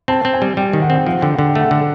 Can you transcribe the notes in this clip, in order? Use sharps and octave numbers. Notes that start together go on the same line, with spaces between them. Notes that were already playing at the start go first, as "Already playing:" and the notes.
C4 A5
C4
G#5
G3
G3 G5
D#3
F#5
C4
G5
F3 F#5
D3 G5
D3 F#5
G5
A3 F#5
D3